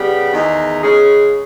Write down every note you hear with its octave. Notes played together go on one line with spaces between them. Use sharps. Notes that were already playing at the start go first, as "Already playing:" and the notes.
Already playing: C#3 G3 B3 G4
E2 D#3 G#3 D#4
C#3 G#3 C#4 G#4